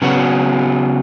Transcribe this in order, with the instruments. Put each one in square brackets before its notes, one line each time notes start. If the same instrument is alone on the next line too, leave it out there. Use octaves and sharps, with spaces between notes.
[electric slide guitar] C#3 F#3 B3 F#4